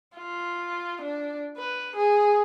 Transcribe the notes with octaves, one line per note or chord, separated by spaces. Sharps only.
F4
D4
B4
G#4